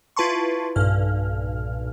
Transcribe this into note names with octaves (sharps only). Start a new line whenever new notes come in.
E4 F4 B4 A5 C6 C#6
B1 G2 A#2 F6